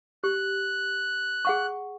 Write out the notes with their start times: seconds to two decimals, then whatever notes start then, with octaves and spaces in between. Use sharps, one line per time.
0.24 G4 F#6
1.45 G#4 F#5 C#6